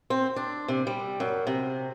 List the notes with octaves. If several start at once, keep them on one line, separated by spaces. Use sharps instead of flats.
C4
D4
C3
G3
F#2
C3